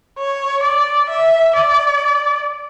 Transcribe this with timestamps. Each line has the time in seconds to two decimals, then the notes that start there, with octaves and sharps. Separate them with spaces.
0.18 C#5
0.63 D5
1.09 E5
1.56 D5